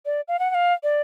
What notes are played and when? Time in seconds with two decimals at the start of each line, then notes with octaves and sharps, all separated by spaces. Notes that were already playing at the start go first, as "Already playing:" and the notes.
0.06 D5
0.28 F5
0.39 F#5
0.50 F#5
0.55 F5
0.83 D5